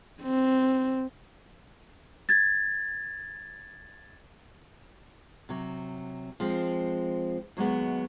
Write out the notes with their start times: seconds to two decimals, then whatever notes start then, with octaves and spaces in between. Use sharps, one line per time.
0.23 C4
2.29 G#6 A6
5.49 C3 F#3
6.40 F3 G#3 C4
7.57 D#2 F#3 G#3 B3